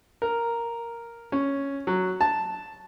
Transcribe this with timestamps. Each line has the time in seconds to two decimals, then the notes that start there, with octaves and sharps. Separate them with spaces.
0.22 A#4
1.32 C#4
1.87 F#3
2.21 A5